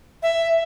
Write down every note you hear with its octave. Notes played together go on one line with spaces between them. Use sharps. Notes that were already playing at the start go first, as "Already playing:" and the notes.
E5